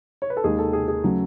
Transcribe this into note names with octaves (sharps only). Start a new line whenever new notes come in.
C#5
B4
A4
D#2 D#3 G#3 G#4
A4
G#4
G#4
C#3 F#3 A3